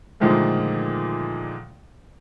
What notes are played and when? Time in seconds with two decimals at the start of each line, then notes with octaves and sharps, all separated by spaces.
0.20 A#2 D3 D#3 F3 G#3 A3